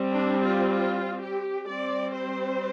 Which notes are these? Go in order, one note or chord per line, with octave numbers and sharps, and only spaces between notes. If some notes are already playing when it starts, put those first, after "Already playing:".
Already playing: G3 C4
D4
F4
F4
G4
G3 C4 D5
C5